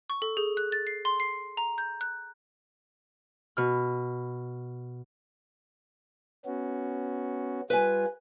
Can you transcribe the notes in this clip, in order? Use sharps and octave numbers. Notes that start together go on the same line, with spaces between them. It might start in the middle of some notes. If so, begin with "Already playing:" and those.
C#6
A4
G#4
F#6
A6
C7
C6
C7
A#5
G6
F#6
B2 F6
B3 C#4 F#4
G3 F4 B4 G#5